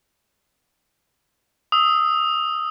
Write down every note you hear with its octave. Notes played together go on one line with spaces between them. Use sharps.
D#6 E6